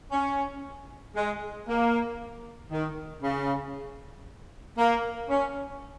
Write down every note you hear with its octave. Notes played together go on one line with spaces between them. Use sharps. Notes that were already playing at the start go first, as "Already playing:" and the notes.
C#4
G#3
A#3
D#3
C#3
A#3
C#4